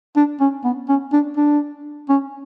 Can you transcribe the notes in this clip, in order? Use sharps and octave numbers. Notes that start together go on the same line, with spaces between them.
D4
C#4
B3
C#4
D4
D4
C#4